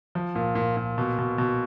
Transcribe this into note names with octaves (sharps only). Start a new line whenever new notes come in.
F3
A#2
A#2
A#2
B2
B2
B2